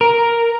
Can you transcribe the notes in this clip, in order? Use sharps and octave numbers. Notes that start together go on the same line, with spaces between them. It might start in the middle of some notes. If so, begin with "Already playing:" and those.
A#4